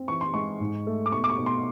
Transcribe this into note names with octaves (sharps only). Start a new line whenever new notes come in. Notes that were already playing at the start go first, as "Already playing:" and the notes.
Already playing: C4
E3 C#6
C6
G#3 C#6
G#2
A3
D6
B2 C#6
D6
C#6
B2
C6